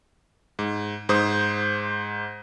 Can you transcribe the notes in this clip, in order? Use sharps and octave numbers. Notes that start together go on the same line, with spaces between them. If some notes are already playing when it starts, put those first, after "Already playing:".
G#2
G#2 C5 D#6